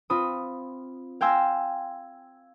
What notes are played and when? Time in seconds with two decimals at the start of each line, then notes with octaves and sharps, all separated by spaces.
0.10 C4 F4 B5 D#6
1.21 F5 G5 G#5 C6 E6 A#6